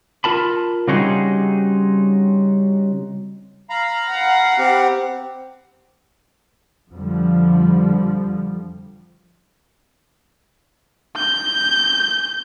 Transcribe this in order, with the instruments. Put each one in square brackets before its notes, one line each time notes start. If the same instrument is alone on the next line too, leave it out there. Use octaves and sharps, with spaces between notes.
[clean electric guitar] F4 A#4 A5 B5
C#3 G3 C4 D#4 F#4 G#4
[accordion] F5 A#5 B5
[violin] F#5
[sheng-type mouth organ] C4 G4
[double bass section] F2 D3 F3 G3
[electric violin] G6